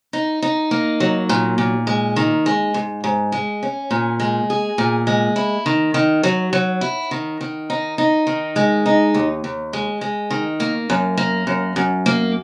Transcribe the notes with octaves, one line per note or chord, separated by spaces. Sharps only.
D#4
D#4
A#3
F#3
A#2
A#2
G#3
D#3
G#3
G#2
G#2
G#3
C#4
A#2
G#3
G#4
A#2
G#3
E4
D#3
D#3
F#3
F#3
E4
D#3
D#3
D#4
D#4
D#3
G#3
D#4
D#2
D#2
G#3
G#3
D#3
A#3
F#2
A#3
F#2
F#2
A#3